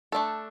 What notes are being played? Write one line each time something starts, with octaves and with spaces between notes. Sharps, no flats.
A3 D4 A4